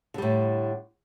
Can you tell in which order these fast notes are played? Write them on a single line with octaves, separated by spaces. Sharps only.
D3 G3 A2